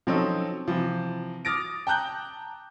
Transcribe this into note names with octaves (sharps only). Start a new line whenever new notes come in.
F3 F#3 C4 C#4 D#4 A4
C3 E3 F3
D6 D#6 F6 A6 A#6 D7
G5 A5 A#5 F#6 G6 G7